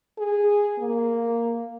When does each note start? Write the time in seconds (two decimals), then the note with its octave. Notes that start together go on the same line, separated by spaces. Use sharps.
0.19 G#4
0.79 A#3